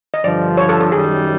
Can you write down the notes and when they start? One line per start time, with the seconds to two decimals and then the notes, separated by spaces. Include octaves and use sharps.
0.14 D#5
0.23 G2 D3 F3 D5
0.57 C#5
0.69 A4
0.81 A4
0.92 F#2 D#3 G3 G#4